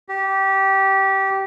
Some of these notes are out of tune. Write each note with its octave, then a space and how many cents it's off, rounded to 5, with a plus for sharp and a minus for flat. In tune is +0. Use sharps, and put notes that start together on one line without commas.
G4 -20